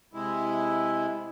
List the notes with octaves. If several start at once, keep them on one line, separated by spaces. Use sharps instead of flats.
C3 G#3 E4